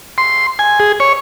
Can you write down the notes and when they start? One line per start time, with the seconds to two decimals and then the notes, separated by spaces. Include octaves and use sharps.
0.18 C6
0.59 G#5
0.80 G#4
1.00 C#5